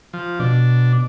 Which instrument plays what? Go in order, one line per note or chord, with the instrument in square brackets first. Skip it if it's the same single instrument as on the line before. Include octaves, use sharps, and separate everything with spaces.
[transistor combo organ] F3
[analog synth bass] B2 [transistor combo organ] D4